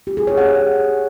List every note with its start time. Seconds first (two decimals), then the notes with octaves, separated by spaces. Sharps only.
0.07 G4
0.17 G#4
0.27 C#5
0.38 F#5